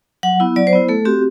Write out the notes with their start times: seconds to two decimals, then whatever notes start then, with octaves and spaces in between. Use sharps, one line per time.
0.23 F#3 F#5
0.40 B3 E4
0.56 F#3 D5
0.67 C5
0.73 B3 E4
0.89 A3 A4
1.05 C4 F#4 G4